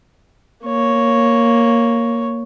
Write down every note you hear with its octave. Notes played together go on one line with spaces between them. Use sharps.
A#3 C#5